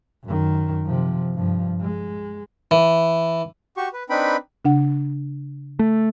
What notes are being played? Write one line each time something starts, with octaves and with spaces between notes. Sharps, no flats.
F#2 D#3
C3 F3
G2 F3
G#3
E3
F#4 G4 C#6
B4
C4 D4 D#4 B4 G5 B5
C#3 D4 F#5
A3